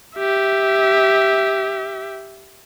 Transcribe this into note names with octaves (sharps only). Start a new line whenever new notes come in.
G4 E5